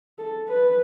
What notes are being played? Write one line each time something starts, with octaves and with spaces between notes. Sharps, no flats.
A4
B4